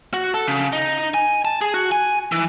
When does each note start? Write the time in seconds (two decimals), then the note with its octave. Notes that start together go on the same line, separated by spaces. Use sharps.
0.14 F#4
0.34 A4
0.47 C#3
0.73 D#4
1.14 G#5
1.45 A5
1.61 G#4
1.74 F#4
1.92 G#5
2.32 E3